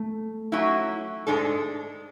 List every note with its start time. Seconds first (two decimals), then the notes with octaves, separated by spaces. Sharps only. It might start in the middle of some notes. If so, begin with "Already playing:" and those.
Already playing: A3
0.52 F#3 C#4 E4
1.27 G#2 G#3 D4 A4